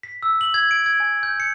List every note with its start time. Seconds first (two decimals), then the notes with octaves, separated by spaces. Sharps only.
0.03 B6
0.23 E6
0.41 F#7
0.54 G#6
0.71 D7
0.86 G#6
1.00 G#5
1.23 G6
1.40 C#7